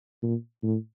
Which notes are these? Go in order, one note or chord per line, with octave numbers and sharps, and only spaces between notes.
A#2
A2